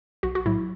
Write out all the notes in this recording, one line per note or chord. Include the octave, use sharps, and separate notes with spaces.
B1 F#4
F#4
A2 F#3 E4